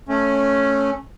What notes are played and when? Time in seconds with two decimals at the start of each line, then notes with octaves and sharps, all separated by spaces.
0.09 A3 C#4